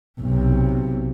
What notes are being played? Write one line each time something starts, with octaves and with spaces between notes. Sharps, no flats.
B1 C3